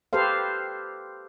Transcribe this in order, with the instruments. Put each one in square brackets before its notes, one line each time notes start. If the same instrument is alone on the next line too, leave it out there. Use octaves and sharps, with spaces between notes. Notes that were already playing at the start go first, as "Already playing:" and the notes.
[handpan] G4 A4 B4 C5 F5